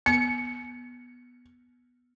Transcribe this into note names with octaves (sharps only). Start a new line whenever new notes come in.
B3 C#7